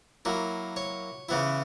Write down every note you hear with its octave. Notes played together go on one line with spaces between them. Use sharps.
F#3 A#3 E4
C#5
C#3 E3 B3 E4